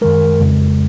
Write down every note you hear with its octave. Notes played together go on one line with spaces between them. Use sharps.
F#2 D#3 G#3 A#4
F2 C#3 G#3